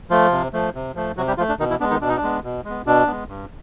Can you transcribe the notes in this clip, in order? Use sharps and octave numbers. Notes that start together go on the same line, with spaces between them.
F3 A3 F4
C3
F3 A3
C3
F3 A3
C3 F#3 F#4
G3 G4
F3 A3 F4
D4
B2 D#3 D#4
E3 E4
G#3 B3 D4
D#3 D#4
B2 D4
D#4
D4
G#3 B3
B2
G#3
B3
B2 D4
G#3 B3
G2